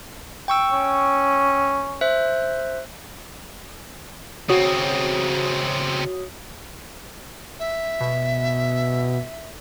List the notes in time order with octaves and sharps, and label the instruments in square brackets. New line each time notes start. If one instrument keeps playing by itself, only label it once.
[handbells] G5 C#6 E6
[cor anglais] C#4
[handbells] C5 E5 F#6
[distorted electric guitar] C#3 C4 [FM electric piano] F#4 C#5 D#6
[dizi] E5
[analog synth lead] B2